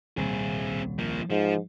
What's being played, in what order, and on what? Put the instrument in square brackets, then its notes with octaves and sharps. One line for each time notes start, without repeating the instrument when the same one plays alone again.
[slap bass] D#1 C2 A#2 [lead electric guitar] C4 G#4
[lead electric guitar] F3 A#3
[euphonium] G#2 [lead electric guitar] F3